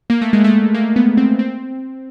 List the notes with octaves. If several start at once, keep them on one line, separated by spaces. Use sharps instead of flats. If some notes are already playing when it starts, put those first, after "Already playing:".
A#3
A3
G#3
A3
A#3
B3
C4
C4